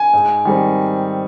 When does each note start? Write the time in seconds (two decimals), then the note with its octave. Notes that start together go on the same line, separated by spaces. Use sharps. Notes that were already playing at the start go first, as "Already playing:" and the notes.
Already playing: G#5
0.13 G#2
0.45 D#3 G3 C4